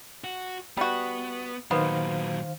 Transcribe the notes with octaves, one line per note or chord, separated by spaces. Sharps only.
F#4
G3 B3 F#4
A#2 D#3 F#3 B3 C5 F5